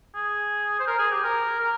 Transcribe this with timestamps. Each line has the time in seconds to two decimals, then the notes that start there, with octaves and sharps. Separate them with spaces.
0.15 G#4
0.80 C5
0.88 A#4
0.99 G#4
1.11 G4
1.24 A#4
1.60 A#4